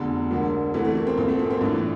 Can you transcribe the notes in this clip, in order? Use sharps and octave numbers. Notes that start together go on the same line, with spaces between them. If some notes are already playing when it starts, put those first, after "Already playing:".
Already playing: F1 E2 D3
E1 D2 D3 A#3
D2 C3 E3 A3
A3
A#3
C4
A#1 A#2 C4
A3
A#3
C4
A#1 A2 E3 D4